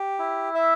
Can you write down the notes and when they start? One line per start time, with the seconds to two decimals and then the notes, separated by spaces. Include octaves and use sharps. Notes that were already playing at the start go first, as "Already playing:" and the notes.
Already playing: G4
0.19 E4
0.55 E5